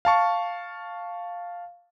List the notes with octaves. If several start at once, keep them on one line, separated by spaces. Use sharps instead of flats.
F5 A5 C#6